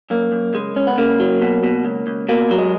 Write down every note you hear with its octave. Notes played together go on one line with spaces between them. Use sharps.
F#2 A#3
F#2
C#2 G#3
C#2 C#4
B3
C#3 A#3
F#3
B2
B2
C#2
C#2
B2 A#3
F#3
G#3